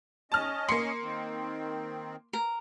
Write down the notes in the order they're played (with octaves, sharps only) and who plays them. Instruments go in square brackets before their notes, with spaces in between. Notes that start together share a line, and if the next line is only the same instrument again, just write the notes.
[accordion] C#4 D#5 [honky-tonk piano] A5 F6
[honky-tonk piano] A#3 C#7 [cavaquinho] C6
[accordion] D#3 C4
[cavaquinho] A#4